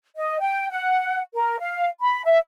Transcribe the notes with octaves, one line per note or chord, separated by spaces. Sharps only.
D#5
G5
F#5
A#4
F5
B5
E5